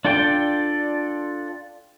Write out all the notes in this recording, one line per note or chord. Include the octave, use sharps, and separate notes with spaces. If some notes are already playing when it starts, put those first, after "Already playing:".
D4 F4 A4 D5 G5